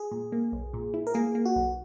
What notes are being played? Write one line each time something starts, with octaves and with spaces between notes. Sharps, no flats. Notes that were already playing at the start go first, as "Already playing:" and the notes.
Already playing: G#4
A#2
A#3
B1
A#2
E4
A#4
A#3 G#4
A#3
F#4
B1